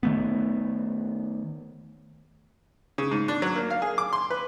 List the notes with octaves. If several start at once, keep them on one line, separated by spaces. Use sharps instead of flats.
D#3 A3 B3
C#3
G#2
D4
F#3
A#3
F5
G#4
D6
C6
B4